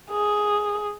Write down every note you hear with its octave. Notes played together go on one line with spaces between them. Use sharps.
G#4